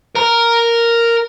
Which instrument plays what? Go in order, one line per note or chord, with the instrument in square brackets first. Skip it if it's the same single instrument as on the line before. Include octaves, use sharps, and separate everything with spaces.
[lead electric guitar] A#4 A#5